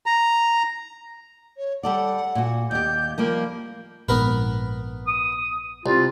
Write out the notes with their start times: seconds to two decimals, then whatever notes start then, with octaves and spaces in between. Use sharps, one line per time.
0.06 A#5
1.57 C#5
1.83 G3 A4 D5 F#5
2.35 A#2 F#4
2.71 D#2 G4 G6
3.18 F3 G3 A#3 A#4
4.09 A#1 G#2 B3 A#4 B4
5.08 D#6
5.86 C2 F4